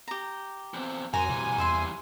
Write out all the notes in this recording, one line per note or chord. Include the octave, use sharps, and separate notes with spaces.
G4 A#5
E2 C4
F2 F#3 A#4 C5 G#5 A#5
B2 E3 G3
E2 C5 E5 C6